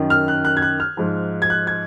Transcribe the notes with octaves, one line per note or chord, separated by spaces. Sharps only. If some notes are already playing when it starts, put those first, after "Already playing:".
Already playing: F#2 D#3
F6
F#6
F#6
G#6
F#6
F6
G#2 F3
G#6
F#6
G#6